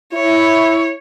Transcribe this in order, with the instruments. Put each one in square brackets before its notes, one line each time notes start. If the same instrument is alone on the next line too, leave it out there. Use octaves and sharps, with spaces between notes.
[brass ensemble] E4 [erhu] C#5